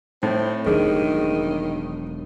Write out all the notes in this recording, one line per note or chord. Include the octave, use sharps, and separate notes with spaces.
A2 C4 D#4
E1 D#3 F#3 D4 G#4